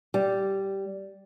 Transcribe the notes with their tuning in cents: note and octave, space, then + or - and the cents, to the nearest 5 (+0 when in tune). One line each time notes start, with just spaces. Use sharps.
G3 -10